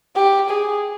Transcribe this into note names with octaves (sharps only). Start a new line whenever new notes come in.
G4
G#4